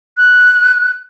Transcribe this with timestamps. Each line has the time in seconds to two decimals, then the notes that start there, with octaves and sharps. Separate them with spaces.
0.17 F#6